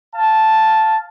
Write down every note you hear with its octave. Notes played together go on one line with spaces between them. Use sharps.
F5 A5